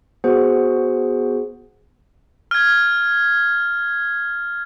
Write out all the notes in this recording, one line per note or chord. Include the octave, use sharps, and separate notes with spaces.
B3 F#4 G#4 C5 F#5 G#5
F6 G#6